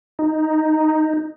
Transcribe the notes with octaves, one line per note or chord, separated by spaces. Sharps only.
D#4